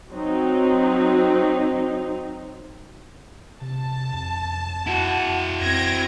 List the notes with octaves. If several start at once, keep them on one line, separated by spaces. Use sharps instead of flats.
F#3 C4 D#4
C3 A5
F2
F2 E4 F#4 F#5
F2
F2 C4 G#6 A#6 D7